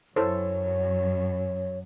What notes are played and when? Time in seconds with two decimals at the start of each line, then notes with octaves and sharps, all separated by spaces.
0.16 F#2 E4 A4 C5 C#5